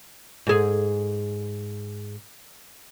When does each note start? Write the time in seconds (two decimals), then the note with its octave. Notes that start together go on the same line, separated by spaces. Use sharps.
0.47 G#2 G#4